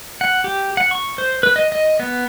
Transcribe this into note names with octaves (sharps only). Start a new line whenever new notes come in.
F#5
G4
F#5
C#6
C5
B4
D#5
D#5
B3